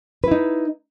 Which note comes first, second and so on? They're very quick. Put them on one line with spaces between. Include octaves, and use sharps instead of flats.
B4 E4 D#4